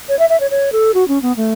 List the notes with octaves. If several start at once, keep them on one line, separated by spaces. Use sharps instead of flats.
C#5
E5
E5
C#5
C#5
A4
F#4
C#4
B3
A3